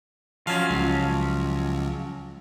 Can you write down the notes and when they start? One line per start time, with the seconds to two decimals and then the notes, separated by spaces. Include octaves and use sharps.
0.47 F3 F#3 C#4 F5
0.71 C#2